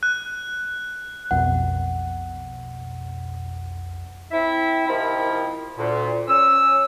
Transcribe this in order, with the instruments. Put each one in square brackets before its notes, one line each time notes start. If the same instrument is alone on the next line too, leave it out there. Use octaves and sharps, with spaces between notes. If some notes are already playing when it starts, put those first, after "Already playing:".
[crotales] F#6
[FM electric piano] B1 F2 B2 [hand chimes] F#5
[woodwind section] C4 E4 E5
C3 D#3 F3 E4 A#4 B5
D2 A#2
C#4 E6